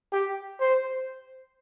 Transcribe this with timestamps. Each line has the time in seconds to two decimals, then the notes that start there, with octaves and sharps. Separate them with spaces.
0.12 G4
0.60 C5